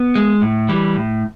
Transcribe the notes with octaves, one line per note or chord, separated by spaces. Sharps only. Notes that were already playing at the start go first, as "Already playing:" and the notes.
Already playing: B3
G#3
A2
E3 G3
A2